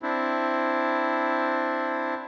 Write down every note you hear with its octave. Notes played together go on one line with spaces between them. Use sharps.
C4 D4 E4